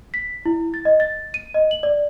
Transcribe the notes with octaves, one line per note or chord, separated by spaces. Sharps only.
B6
E4
A6
D#5
A6
D#7
D#5
F#7
D5